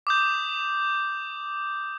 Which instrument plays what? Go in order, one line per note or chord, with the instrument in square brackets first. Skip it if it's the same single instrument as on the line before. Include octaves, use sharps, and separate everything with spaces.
[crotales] D6 D#6 G6